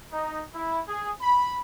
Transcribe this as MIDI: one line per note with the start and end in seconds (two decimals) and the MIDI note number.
0.11 0.42 63
0.54 0.79 64
0.88 1.10 68
1.20 1.59 83